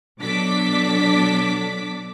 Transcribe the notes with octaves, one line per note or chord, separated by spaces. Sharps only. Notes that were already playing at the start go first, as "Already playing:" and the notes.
B2 F#3 D4 A4 D6 B6